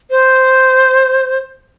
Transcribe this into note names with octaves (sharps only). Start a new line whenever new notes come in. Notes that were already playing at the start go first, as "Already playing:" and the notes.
C5